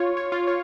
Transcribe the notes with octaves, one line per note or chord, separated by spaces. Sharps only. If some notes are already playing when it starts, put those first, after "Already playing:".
Already playing: F4 C#5
C#5
F4
C#5